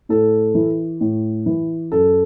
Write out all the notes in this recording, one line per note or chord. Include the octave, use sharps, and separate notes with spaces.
A2 A4
E3
A2
E3
F#2 A4